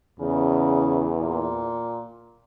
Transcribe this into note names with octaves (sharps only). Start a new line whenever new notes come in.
E2 C#3
A#2